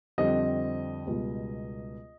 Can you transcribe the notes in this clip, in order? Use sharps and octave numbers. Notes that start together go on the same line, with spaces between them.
F2 D3 G3 C4 D#5
C#2 B2 G3